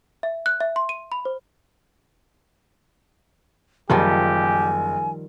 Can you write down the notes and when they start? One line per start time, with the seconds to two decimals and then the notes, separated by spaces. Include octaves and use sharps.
0.23 E5
0.46 F#6
0.60 E5
0.76 C6
0.89 D#7
1.12 B5
1.25 C5
3.90 F#1 D#3 F3 G3 G4 G#5